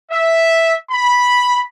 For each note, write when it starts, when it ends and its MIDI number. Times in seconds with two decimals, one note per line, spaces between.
0.11 0.74 76
0.91 1.60 83